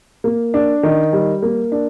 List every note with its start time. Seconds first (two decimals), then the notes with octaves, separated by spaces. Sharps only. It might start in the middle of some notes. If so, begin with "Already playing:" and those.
0.24 A#3
0.54 D4
0.83 D#3
1.13 G3
1.42 A#3
1.72 D4